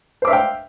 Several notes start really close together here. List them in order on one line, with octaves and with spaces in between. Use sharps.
C5 D6 E5 F5 G5